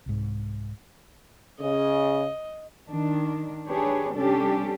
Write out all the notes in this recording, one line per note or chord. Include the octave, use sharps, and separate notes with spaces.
C2 G#2
C#3 D#5
D#3 D4
D4 G4 G#4 B4 C#5
C3 G3 C#4 D4 G4 A4